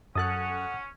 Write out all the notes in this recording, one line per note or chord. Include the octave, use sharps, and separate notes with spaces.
F#2 C#4 A4 F#5 D#6 F#6 A6